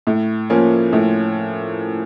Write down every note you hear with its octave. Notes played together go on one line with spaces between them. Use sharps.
A2
F3 A#3 C#4
A2